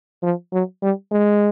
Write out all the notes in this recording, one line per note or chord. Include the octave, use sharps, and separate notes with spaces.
F3
F#3
G3
G#3